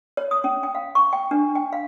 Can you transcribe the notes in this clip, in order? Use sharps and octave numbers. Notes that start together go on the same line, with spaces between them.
C#5
D#6
C#4
G5
F5
C#6
G5
D4
G5
F5